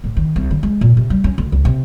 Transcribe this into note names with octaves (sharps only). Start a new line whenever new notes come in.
A2
D#3
C2
D3
G#3
A#2
C3
G3
C#4
D2
C#2
C3